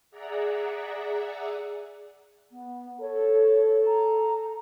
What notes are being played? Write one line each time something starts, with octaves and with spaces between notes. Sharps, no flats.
G#4 D5 E5 F#5 A#5
B3
A4 C#5
A#5